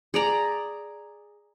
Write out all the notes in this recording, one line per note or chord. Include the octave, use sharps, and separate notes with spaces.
G#4 D5 A#5